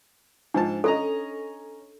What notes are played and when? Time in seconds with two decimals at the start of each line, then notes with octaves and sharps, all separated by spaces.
0.54 G#2 F3 D4 A5
0.84 C#4 A4 D#5 A#5